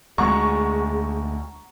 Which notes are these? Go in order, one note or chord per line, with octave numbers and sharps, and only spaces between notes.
D2 G#3 G#4 F#5 A#5 C#6